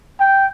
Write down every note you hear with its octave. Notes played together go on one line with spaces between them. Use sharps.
G5